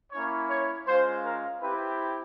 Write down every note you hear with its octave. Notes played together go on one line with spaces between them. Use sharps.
A#3 C#4 E4 C#5
C#5
G#3 C#4 F4 C5
A#4
C4 E4 G4 B4